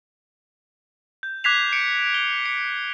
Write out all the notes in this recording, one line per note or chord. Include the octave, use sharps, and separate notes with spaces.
G6
D6 F#6 G#6 B6 C7 F7
C#7 D7
G7
C#7